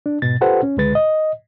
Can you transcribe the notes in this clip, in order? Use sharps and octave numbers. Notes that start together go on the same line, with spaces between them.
D4
G#2 B2 A6
F4 G4 A4 B4 C5 F#5
C#4
C#2 D3 G#3 B4 A6
D#5